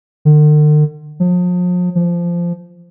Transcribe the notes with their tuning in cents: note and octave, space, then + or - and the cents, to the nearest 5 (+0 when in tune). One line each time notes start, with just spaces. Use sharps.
D3 +45
F3 +40
F3 -15